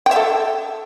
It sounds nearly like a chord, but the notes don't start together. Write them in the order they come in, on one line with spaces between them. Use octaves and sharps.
G5 E5 A4